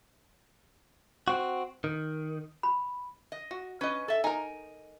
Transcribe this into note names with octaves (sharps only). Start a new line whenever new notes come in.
C4 F#4
D#3
B5
D#5
F#4
C#4 B4 D#5 B5
A4 E5
D#4 A#4 G#5